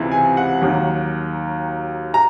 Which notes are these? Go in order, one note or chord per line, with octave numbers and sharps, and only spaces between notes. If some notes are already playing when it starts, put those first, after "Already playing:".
Already playing: C#2 C3 E3
G#5
F#5
D#2 D#3 F#3
A#5